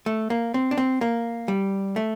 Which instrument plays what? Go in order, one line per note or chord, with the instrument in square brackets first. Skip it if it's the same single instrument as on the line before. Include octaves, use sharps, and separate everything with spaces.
[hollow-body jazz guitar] A3
A#3
C4
D4
C4
A#3
G3
A3